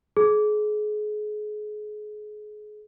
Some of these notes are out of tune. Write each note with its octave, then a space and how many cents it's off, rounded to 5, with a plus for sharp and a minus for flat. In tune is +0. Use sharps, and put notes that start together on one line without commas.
G#4 +30